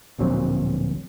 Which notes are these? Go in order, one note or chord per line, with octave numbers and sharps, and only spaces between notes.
D1 A#1 F#3 C4